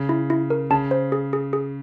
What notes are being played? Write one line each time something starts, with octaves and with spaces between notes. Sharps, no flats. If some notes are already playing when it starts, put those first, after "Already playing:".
Already playing: C#3
E4
E4
A#4
C#3 A5
C5
G#4
G#4
G#4